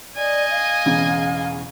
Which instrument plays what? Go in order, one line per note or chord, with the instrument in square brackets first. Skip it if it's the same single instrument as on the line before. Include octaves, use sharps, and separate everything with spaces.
[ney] D5 [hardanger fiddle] D#5 G#5
[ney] F5
[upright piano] E1 E2 C#3